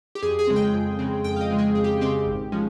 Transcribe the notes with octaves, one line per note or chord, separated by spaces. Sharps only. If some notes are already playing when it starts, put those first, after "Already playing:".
G4
F2 G#4
G#4
C#3 G#3 C4
G5
F2
C#3 G#3 C4
F2 G5
F5
D#5
C#3 G#3 C4
G#4
F2 G#4
G4
C#3 G#3 C4 G4
G#1
F3 G#3 C#4